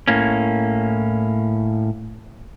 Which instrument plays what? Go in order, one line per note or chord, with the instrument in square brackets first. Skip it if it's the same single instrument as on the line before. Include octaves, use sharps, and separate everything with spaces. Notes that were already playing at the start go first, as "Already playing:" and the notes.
[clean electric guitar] A2 A#3 C#4